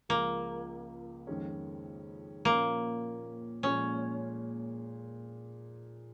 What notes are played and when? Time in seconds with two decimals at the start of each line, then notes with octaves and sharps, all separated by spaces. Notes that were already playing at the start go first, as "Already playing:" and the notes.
0.09 C#2 C#3 F3 A#3
1.27 F2 D#3 G#3 C#4
2.45 A#2 F3 A#3 C#4 A#4
3.63 A#2 F3 G#3 C#4